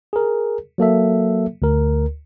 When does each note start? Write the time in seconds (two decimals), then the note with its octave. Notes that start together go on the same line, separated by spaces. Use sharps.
0.13 G#4 A#4
0.78 F#3 A#3 A4 E5
1.62 D2 A#4